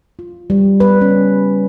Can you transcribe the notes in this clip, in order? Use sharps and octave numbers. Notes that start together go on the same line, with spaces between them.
F4
G3
B4
C#4